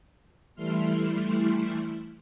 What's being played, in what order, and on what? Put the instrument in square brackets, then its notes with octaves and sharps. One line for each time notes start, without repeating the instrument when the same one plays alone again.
[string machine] E3 G3 A3 E4 C6 F6